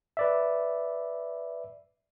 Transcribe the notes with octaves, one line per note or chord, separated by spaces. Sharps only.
B4 D5 E5